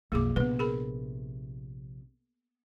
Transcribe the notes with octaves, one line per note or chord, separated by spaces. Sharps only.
B1 F2 A#3 G#4 D6
A#1 C3 B3 B4
G#4 A#4 B5